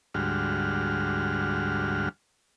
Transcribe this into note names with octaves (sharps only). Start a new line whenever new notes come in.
D2 G#2 G3 F#4 F6